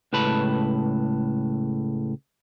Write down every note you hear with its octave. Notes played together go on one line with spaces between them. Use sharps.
C#2 A2 B4 A5 B5